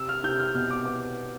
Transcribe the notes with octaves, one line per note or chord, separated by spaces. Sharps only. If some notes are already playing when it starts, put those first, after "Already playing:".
Already playing: C3 E6
F6
C3 G6
F6
B2 F6
D6
B3 D6